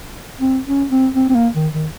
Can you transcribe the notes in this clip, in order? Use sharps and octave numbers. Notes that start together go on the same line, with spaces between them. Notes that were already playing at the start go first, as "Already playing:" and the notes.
C4
C#4
C4
C4
C4
A#3
D#3
D#3